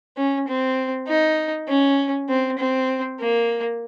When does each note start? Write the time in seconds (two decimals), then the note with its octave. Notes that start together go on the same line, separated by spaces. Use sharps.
0.17 C#4
0.48 C4
1.08 D#4
1.68 C#4
2.29 C4
2.59 C4
3.20 A#3